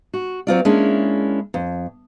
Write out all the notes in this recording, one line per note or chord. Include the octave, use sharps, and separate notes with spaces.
F#4
F#3 C4 F4 D5
G#3 A#3 C#4 D4 E4
F2